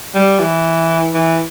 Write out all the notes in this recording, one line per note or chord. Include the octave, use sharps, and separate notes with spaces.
G3
E3
E3